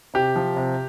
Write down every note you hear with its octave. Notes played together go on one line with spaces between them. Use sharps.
C3 G4
F3
C3